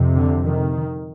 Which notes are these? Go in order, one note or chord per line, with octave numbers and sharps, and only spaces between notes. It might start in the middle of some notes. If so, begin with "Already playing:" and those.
Already playing: F2 C3
D3
D#3